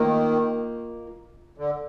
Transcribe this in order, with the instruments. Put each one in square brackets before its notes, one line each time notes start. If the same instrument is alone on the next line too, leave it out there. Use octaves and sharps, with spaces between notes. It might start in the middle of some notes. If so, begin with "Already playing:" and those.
Already playing: [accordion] D#3 [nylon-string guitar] A#3 F4 A#4 D#5
[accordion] D3